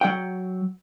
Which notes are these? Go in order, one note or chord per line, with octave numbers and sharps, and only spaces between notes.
F#3 F#5 G5